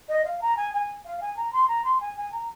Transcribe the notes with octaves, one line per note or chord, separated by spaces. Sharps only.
D#5
F5
A#5
G#5
G#5
F5
G#5
A#5
C6
A#5
C6
G#5
G#5
A#5